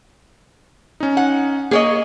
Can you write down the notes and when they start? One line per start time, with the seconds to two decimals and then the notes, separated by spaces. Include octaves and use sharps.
1.00 C#4 D#4
1.17 F#5
1.71 A#3 G#4 C#5 D#5